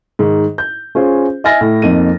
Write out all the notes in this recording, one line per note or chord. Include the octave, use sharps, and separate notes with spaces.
G#2 D#3
G6
C#4 F4 G#4 C5
D#5 E5 G#5 F6 A6 A#6
A2
F2 A#3 D#4 D#7